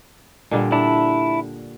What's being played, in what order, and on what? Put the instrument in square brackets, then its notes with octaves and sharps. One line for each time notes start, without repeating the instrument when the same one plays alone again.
[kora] A#2 D3 G3
[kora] D4 [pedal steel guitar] E4 A5